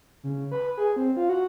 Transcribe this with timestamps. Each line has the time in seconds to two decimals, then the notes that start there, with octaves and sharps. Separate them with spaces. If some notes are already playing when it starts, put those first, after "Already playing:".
0.24 C#3
0.52 B4
0.78 G#4
0.96 C4
1.17 F4
1.29 F#4